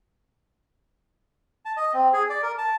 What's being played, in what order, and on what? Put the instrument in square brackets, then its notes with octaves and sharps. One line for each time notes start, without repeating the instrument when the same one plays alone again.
[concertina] A5
D#5
C4
G#4
D5
A#4
A5